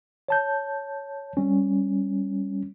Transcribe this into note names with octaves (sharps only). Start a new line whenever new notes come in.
C#5 A5 G6
G3 C#4